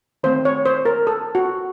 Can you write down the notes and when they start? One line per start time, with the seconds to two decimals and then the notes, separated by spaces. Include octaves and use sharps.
0.23 D#3 A3 C4 C5
0.45 C#5
0.66 C5
0.85 A#4
1.07 A4
1.35 F#4